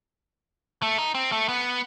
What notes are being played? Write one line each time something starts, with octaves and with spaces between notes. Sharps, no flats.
A3
D#4
C4
A3
B3